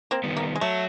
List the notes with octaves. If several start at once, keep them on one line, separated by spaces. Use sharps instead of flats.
A#3 C4
D#3 G3 B3
A#3
G#3
F#3 A3